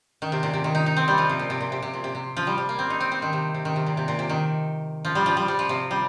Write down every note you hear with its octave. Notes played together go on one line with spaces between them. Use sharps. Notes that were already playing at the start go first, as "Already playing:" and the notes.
D#3
C3
A#2
C3
D#3
D#4
D#4
C4
G3
F3
C3
A#2
C3
A#2
C3
C3
A#2
C3
C3
F3
G3
G3
A#3
C4
D#4
C4
C4
D#3
C3
C3
D#3
C3
A#2
C3
A#2
C3
D#3
F3
G3
F3
G3
G3
F3
C3
G3